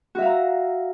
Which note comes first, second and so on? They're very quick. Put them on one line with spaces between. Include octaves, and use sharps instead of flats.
F#4 E5 F5 A#5